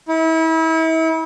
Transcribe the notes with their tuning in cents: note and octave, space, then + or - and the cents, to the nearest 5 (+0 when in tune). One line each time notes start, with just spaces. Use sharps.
E4 -35